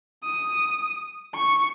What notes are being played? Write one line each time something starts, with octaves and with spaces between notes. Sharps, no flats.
D#6
C#6